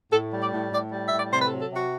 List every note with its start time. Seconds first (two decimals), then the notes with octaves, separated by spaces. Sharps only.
0.11 A2 A4
0.32 G3
0.41 D5
0.52 A2
0.71 A2 D5
0.92 G3
1.07 A2 E5
1.17 D5
1.32 C3 C5
1.40 B4
1.46 A4
1.52 F#3
1.61 A4
1.72 C3 F#4